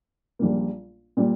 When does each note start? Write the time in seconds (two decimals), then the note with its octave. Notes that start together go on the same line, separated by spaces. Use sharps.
0.39 A#1 A#2 G3 A#3
1.17 A#2 G3